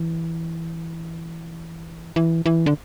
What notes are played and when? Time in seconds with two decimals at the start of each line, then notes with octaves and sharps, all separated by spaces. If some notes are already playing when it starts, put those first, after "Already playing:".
Already playing: E3
2.16 E3
2.46 E3
2.66 D3